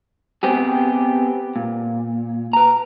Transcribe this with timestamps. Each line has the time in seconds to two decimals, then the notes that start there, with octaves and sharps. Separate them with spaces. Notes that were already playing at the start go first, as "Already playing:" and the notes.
0.43 B3 C4 G4 G#4
1.56 A#2
2.53 B4 A#5